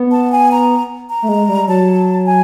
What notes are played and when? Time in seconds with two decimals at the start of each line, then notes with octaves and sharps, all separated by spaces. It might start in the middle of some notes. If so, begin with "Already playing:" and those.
Already playing: B3
0.11 A5
0.32 G#5
0.52 A#5
1.10 A#5
1.22 A3
1.29 G#3
1.48 G3
1.68 F#3 A5
2.26 G#5